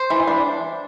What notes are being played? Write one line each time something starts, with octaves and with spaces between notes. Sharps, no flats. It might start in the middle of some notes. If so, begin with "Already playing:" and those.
Already playing: C5
E3
D4